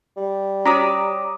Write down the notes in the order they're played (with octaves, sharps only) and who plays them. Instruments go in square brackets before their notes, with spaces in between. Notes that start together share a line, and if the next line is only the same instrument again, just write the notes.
[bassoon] G3
[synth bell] C#4 F#4 C#5 [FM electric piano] A#5 D6 D#6